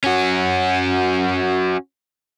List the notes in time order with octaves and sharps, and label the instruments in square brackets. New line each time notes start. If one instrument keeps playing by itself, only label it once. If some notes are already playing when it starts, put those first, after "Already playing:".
[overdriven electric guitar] C#4 F#4